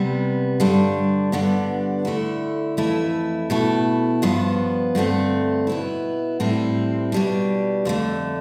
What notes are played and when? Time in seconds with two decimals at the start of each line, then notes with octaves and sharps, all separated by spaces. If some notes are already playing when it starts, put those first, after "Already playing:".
Already playing: C3 G3 B3
0.60 G2 D3 G3 D4
1.32 G2 D3 G3 B3 D4
2.05 D3 A3 E4
2.77 F2 E3 A3 E4
3.50 B2 A3 E4
4.22 G2 F3 B3
4.95 G2 D3 A3 C4
5.67 B2 B3 E4
6.40 A2 G3 C4 E4
7.12 B2 G3 D4
7.85 F2 D3 A3